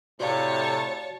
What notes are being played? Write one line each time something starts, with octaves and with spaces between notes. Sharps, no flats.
A2 C3 F#4 C#5 D5 F5 A5